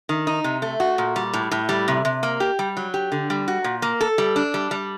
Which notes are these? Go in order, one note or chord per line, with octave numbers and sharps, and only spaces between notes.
D#3
D#4
C3
A3
F#4
A#2
G3
A2
A2
G3
C3
C3
A#3
G4
G3
F#3
G4
D3
G3
F#4
A#2
A#3
A4
G3
D4
G3
G3